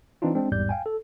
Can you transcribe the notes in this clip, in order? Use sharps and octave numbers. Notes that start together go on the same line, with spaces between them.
E3 C4 D4 D#4 F4
G#3 C4 D4
A1 E2 G#2 G3 D5 G6
F5 G5 G#5
A4